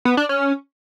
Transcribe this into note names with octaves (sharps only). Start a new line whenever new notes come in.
B3
D4
C#4